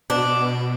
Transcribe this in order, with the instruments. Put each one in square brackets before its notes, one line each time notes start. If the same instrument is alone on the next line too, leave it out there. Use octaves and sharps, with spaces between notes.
[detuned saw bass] B2 [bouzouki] D4